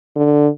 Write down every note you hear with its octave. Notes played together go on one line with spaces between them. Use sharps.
D3